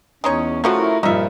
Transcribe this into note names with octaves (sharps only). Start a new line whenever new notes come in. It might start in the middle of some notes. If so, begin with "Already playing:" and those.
E2 G#3 C#4 D#4 C#5
C#3 F3 F#3 A3 F4 F#4
E4 A#4
G2 A#2 F3 D#4 E5